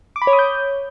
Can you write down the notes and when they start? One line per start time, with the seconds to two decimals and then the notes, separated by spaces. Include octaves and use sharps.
0.16 D6
0.22 B5
0.27 C#5
0.33 D#6
0.39 G6